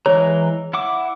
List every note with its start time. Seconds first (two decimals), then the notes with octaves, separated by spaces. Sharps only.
0.06 E3 G#3 C#5 A#5
0.73 E4 F#5 D6